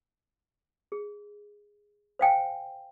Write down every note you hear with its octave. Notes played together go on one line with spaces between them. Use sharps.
G#4
C5 F5 G5 G#5